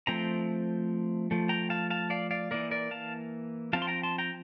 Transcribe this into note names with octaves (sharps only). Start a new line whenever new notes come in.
F3 A3 C4 G5 A#5
F3 A3
G5 A#5
F5 A5
F5 A5
D5 F5
D5 F5
E3 A#3 A#4 D5
A#4 D5
F5 A5
F3 C4 F5 A5
C6
G5 A#5
A5 C6
G5 A#5